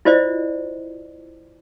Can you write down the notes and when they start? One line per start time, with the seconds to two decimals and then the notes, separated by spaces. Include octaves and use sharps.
0.05 E4 F4 C5 D5 D#5